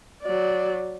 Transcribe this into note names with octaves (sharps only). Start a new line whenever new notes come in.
F#3 D5